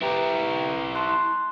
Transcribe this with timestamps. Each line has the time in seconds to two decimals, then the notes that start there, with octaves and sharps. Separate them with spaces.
0.01 E4 G4 B4 G5 A#5
0.95 A5 C6 F#6